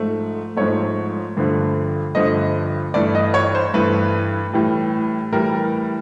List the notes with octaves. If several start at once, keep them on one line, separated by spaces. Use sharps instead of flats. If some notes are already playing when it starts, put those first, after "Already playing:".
Already playing: G#2 F3 A3
G#2 F3 A3 C#5
G2 D3 F3 A3
G2 D3 F3 A3 D#5
G2 E3 A3 D5
D#5
C#5
C5
G2 E3 A3 B4
A2 E3 G3
A2 E3 G3 A#4